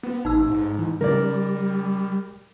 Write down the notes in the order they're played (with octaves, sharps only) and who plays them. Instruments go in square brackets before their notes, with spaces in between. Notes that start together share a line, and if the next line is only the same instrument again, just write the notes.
[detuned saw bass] B3
[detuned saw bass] A1 [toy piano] D#4 E6
[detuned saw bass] G#2
[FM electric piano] E3
[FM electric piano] C#3 [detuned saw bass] G3 [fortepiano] A#4 D5